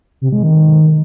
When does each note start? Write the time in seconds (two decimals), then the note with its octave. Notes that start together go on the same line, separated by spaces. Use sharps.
0.21 C3
0.32 G#3
0.43 D#3